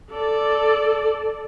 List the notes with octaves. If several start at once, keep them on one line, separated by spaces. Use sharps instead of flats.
A4 D5